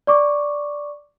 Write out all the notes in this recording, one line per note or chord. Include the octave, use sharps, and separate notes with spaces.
D5 C#6 D6